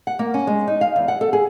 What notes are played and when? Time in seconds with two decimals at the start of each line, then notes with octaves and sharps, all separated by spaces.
0.07 F#5
0.19 A#3
0.34 C#4
0.47 G#3
0.68 D#4
0.81 F5
0.96 E2
1.08 F#5
1.21 A4
1.33 G#4